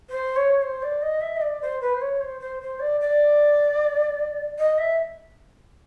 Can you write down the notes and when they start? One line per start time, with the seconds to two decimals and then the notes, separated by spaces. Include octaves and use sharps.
0.09 C5
0.36 C#5
0.62 C5
0.83 D5
1.02 D#5
1.21 E5
1.36 D#5
1.41 D5
1.62 C5
1.81 B4
1.94 C5
2.01 C#5
2.21 C5
2.40 C5
2.61 C5
2.80 D5
3.01 D5
4.58 D#5
4.78 E5